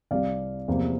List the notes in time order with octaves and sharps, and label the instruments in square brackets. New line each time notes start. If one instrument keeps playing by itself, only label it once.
[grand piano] C2 C3 G3 D5 F5
E2 C3 F3 A#3